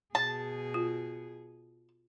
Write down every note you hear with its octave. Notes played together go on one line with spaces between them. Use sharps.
B2 G#4 A5
F4